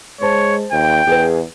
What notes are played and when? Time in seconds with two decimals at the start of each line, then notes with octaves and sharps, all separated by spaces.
0.21 G#3 C5 C#5 A5
0.72 D#2 G5
1.07 E2 G#4 B4